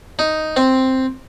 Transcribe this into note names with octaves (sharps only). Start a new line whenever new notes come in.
D#4
C4